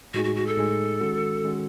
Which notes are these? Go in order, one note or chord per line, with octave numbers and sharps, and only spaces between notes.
A2 G#3 D#4 F#4 G#4
F#4
F#4
A4
A2 G#3 D#4 G#4
D#3 G#3 C#4 F#4
D#3 G#3 C#4 F#4